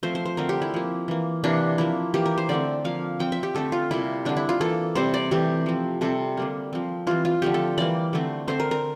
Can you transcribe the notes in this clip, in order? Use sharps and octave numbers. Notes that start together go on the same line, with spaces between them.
F3 A3 C4 C5
C5
C5
D3 A3 C4 A#4
G4
E4
F3 A#3
E3 A#3
C3 E3 A#3 D4
F3 A#3 E4
E3 A#3 G4
A#4
C5
D3 A3 C4 D5
F3 A#3 F5
F3 C4 G5
E5
G4
D3 A3 C4 A4
F4
C3 G3 A#3 E4
D3 G3 C4 D4
E4
F4
E3 A#3 A4
C3 G3 C4 C5
D5
C3 E3 A3 G4
F3 C4
C3 G3 C4 A4
D3 G3 A#3
F3 C4
E3 G3 C4 F4
F4
D3 F3 A3 G4
A4
E3 G3 A#3 D5
D3 A3 C4
D3 A3 C4 C5
A#4
A#4